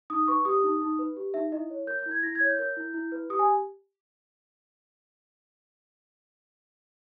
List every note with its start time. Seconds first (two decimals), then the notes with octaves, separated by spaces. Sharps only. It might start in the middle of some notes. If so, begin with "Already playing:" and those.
0.10 D#4 D#6
0.28 B4 C#6
0.45 G4 D#6
0.64 D#4
0.82 D#4
0.99 B4
1.17 G4
1.34 D#4 E5
1.52 E4 D#5
1.70 C#5
1.87 A#4 G6
1.99 G6
2.06 E4
2.11 G#6
2.23 E4 A#6
2.35 G#6
2.40 C#5
2.47 G6
2.59 A#4 G6
2.77 E4
2.94 E4
3.12 B4
3.30 G4 D#6
3.39 G#5